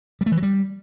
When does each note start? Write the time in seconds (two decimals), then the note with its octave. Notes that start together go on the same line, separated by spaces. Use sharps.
0.21 G3
0.26 A3
0.32 E3
0.37 F#3
0.43 G3